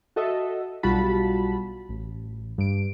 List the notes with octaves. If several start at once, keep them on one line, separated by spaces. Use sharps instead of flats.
F#4 A4 D#5 E5
B1 G3 F4 F#4 A5 B5
A1
G2 D7